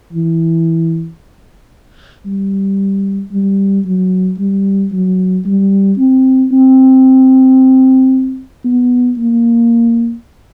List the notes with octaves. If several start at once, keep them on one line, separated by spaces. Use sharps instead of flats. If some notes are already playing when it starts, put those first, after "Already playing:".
E3
G3
G3
F#3
G3
F#3
G3
C4
C4
B3
A#3